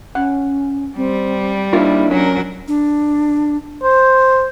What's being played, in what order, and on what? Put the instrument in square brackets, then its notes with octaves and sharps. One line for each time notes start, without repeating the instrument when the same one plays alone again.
[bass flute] C#4 [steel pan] F#5
[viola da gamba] G3 [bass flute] C4
[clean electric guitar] D#3 A#3 E4 [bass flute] D4 [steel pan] F4
[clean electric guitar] C2 C#4 [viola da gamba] F#3 A#4
[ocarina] D4
[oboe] C5